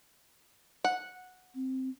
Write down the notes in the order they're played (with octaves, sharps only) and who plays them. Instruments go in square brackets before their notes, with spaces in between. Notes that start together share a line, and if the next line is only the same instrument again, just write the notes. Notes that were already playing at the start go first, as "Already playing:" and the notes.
[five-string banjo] F#5
[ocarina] C4